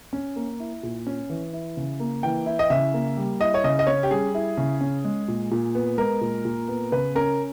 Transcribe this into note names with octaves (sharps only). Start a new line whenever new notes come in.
C#4
A#3
E4
A#2
C#4
E3
E4
C#3
A#3
E3 G5
E4
D#5
C#3 E5
A#3
G3
E4 D#5
C#5
C#3 D#5
D#5
C#4 C#5
G4
G3 G#4
E4
C#3
C#4
G#3
A#2
A#2
B3
G#3 A#4
A#2
A#2
B3
C#3 B4
C#4 A#4